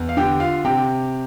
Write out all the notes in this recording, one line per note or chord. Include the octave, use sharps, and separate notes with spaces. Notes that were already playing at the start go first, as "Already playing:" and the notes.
Already playing: E2
F5
D3 G4 G5
F4 F5
C3 G4 G5